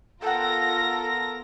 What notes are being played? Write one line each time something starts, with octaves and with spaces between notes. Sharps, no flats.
B3 F4 A4 A#4 F#5 G5 A#5 A#6